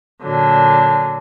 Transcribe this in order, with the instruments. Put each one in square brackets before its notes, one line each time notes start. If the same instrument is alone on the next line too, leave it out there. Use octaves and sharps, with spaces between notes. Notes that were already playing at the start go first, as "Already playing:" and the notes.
[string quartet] A#2 D3 F#3